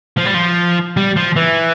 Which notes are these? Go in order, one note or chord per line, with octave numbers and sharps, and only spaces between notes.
F3
G3
F3
G3
F3
E3